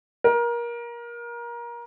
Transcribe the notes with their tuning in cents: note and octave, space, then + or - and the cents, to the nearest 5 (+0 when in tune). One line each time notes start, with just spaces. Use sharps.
A#4 +25